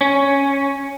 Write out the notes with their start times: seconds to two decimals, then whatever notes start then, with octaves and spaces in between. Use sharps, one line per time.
0.01 C#4